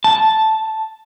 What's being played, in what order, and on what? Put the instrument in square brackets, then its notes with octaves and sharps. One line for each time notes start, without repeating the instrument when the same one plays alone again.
[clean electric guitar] A5